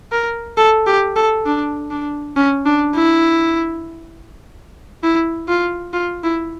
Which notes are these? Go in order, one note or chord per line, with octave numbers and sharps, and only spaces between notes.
A#4
A4
G4
A4
D4
D4
C#4
D4
E4
E4
F4
F4
E4